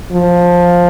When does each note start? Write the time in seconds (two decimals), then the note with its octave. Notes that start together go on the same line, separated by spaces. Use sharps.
0.13 F3